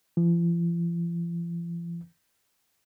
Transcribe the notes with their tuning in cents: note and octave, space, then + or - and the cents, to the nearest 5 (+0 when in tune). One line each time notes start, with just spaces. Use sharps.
F3 -45